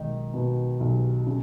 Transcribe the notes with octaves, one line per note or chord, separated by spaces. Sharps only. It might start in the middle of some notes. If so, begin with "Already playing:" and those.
Already playing: B1 D#3 G#3
B2
B1
C#3